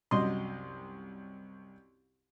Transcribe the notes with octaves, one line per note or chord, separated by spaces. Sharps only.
C2 F#2 D#5 C6